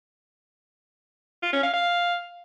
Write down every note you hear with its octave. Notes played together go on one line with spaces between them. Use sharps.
F4
C#4
F5
F5